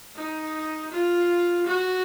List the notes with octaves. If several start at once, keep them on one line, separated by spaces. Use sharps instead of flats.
D#4
F4
F#4